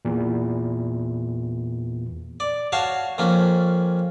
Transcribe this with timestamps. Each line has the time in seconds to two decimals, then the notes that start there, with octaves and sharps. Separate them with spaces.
0.05 E2 A#2
2.40 D5
2.72 F#4 C#5 F5 A5
3.18 F2 A#3 C#4